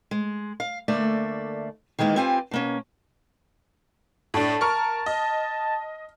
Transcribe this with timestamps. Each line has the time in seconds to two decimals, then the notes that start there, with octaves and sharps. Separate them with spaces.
0.11 G#3
0.60 F5
0.88 D2 A3 A#3 D5 E5
1.99 D#3 E3 G#3 A#3 B3
2.16 C4 F4 G4 B4 G#5
2.51 B2 A#3 C#4
4.34 A2 D4 A5
4.61 A#4 C#6 F6
5.06 D#5